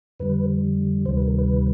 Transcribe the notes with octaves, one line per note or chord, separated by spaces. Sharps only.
F2 D3 G3 B4
D2 C3 D#3 G3 C5
B4
A#4
B4